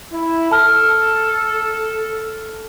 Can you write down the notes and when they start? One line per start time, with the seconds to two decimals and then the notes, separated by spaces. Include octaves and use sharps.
0.12 E4
0.51 A4 A5 F6